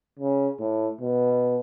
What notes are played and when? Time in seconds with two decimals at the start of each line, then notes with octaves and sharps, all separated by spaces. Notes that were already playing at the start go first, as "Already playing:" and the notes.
0.19 C#3
0.60 A2
1.01 B2